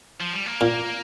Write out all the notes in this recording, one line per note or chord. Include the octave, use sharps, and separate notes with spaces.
F3
G3
A#3
A#2